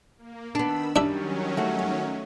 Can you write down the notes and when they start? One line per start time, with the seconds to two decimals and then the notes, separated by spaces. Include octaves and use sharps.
0.18 A#3
0.55 D#3 B3 D4 B5 E6
0.96 D#3 F#3 G3 C#4 D4 E5
1.57 A3 F#4